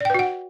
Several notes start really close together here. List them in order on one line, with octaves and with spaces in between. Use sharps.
D5 G5 B4 F#4 F#5